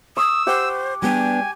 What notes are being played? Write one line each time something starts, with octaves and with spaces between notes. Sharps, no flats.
C#6 D#6 E6
G4 C5 F#5
G3 B3 D4 G5 G#5